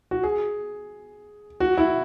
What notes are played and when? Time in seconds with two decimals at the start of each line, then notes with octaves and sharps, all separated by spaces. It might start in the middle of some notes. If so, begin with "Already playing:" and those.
0.11 F#4
0.23 G#4
1.60 F#4
1.77 E4